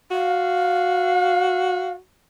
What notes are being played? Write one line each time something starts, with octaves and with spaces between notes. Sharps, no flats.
F#4 F5